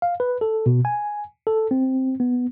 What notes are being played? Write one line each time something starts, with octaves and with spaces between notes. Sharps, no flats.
F5
B4
A4
B2
G#5
A4
C4
B3